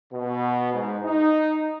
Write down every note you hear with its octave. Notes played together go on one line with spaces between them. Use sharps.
B2
G#2
D#4